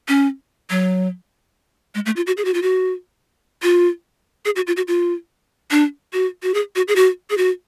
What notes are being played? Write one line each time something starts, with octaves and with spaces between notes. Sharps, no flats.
C#4
F#3
G#3
A3
F4
F#4
G#4
F#4
F4
F#4
F4
G#4
F#4
F4
F#4
F4
D4
F#4
F#4
G#4
F#4
G#4
F#4
G#4
F#4